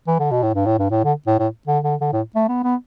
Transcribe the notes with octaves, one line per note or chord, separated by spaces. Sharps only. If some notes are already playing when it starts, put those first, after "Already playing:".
E3
D3
B2
A2
G2
A2
G2
A2
D3
A2
A2
D3
D3
D3
A2
A3
B3
B3